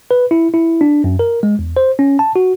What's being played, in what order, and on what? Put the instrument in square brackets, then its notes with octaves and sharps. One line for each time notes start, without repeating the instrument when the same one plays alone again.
[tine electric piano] B4
E4
E4
D4
F#2
A#4
G#3
E2
C5
C#4
A5
F#4